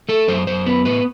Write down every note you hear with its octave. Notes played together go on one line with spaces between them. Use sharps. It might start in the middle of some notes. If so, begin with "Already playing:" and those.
A3 A4
F#2 C5
F#2 C5
B3 B4
A2 B4